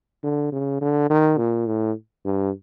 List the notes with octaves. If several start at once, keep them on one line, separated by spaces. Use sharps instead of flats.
D3
C#3
D3
D#3
A#2
A2
G2